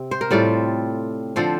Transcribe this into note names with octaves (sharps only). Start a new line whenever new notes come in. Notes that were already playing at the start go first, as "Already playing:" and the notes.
Already playing: C3 C4
C5
A#4
A2 G3 C4 F4 A4
D3 F3 C4 A4 C5